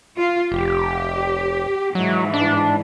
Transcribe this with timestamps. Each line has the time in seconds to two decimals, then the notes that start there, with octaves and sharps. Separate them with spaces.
0.18 F4
0.52 F1 G4
1.95 G#2 E3 F#3
2.34 D4